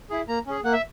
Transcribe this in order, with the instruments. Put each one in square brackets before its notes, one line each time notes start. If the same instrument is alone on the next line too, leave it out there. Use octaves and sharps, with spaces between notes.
[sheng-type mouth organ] E4 G#4
A#3 A#5
C#4 G#4
A#3 F#5
E5